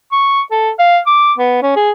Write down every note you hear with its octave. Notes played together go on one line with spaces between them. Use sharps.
C#6
A4
F5
D6
B3
C#4
G#4